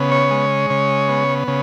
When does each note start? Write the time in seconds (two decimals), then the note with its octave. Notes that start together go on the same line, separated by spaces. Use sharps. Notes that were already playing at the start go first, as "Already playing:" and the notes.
Already playing: C#3 B3
0.12 C#5
0.31 G#3
0.70 C#3
1.09 B3
1.48 C#3